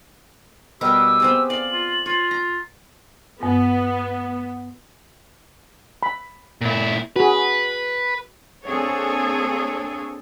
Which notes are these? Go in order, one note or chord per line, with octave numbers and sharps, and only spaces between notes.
B2 G3 G4 A#4 E6
B3 C4 G#4
D5 F5 F#7
F4
F4 C#5
A#5
G2 B3
B5
A#2 E4
F#4 G#4 B4
A#3 C4 D4 G#4 A4 C#5